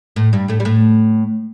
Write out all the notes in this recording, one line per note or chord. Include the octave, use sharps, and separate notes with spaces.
A2 A3
G2 G3
A2 A3
G3
A2 A3